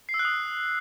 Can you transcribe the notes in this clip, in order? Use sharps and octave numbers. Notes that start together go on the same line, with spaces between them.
C7
E6
F#6
D#6